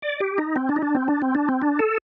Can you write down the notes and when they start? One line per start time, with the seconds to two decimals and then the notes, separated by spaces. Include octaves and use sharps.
0.02 D5
0.20 G4
0.38 D#4
0.56 C4
0.69 D4
0.76 D#4
0.83 D4
0.95 C4
1.08 D4
1.22 C4
1.35 D4
1.49 C4
1.62 D4
1.79 A4